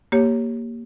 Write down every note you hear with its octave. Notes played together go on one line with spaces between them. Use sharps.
A#3 G4 C#5